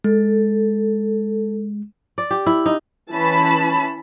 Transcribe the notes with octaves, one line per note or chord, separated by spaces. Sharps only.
G#3 A4
D5
G4
E4
D#4
E3 C#4 A5 B5